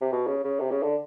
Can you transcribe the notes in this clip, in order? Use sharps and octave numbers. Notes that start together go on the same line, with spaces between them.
C3
B2
C#3
C#3
C3
C#3
D3